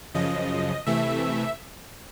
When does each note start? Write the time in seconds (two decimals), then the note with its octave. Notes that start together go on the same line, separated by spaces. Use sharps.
0.14 F#2 C#3 F3 D#5
0.86 C3 E3 A3 E5